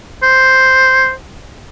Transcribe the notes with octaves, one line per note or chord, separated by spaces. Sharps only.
C5